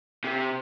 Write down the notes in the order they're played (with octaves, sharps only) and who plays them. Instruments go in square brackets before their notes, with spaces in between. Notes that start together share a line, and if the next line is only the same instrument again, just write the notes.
[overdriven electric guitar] C3